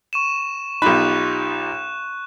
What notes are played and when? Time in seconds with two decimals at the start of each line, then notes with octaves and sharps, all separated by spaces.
0.13 C#6 D#7 E7
0.82 B1 D#4 F4 G4 B5 F#6 E7